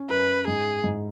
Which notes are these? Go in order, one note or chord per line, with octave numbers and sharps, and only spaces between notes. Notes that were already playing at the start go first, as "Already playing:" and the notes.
Already playing: C#4
F#2 B4
G#2 G#4
G#2